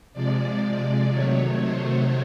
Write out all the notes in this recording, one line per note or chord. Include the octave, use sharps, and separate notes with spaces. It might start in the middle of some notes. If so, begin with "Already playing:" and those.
C3 F3 G#3 D5
C3 D#3 F#3 A3 C#5
C5